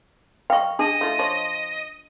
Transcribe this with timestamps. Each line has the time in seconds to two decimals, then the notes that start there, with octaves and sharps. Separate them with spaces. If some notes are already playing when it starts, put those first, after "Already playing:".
0.50 D#5 F5 G5 C#6
0.79 D4 G#4 A4 D#5 A5
1.01 A3 F4
1.19 F3 C#5